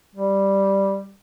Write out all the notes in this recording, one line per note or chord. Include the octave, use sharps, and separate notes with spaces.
G3